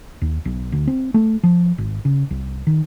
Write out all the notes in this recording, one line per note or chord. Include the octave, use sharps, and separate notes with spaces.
D#2
B1
D2
C4
A3
F3
G#1
C#3
C2
D#3